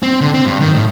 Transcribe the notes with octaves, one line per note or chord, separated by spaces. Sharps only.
C4
D3
C4
G2
D#3
A2